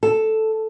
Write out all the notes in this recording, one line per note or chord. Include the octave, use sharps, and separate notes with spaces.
A4